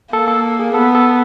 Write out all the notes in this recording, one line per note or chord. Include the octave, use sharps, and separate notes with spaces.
A#3 A4
A4
G#4
B3 A4
A4